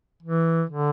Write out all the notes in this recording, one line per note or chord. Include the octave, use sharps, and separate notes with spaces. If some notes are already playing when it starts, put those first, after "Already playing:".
E3
D3